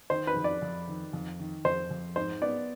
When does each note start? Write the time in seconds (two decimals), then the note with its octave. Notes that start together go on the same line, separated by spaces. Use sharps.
0.10 D#3 C5
0.27 B4
0.36 F2
0.44 D5
0.62 F2
0.88 D#3
1.13 F2
1.39 D#3
1.65 F2 C5
1.91 F2
2.16 G#2 C5
2.42 B3 D5